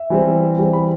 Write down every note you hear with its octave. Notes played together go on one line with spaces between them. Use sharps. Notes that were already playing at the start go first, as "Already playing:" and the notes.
Already playing: E5
E3 G3 C4
E3 G3 C4
B5